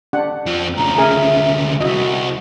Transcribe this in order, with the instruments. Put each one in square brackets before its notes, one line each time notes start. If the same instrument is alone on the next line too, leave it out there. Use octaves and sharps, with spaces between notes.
[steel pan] D4 G4 F#5
[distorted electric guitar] F2 F3
[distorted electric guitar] D2 C#3 [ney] A#5
[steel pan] G#4 A#4 G#5 [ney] E5
[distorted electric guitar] C2 F2 [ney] F#4 [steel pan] D#5 E5